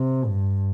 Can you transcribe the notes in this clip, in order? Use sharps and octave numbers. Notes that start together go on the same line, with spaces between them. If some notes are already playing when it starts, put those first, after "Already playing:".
Already playing: C3
G2